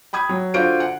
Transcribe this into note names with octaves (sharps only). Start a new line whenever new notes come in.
G5 B5 D#6 G#6
F#3
D3 F4 F#4 C5 D7
F#5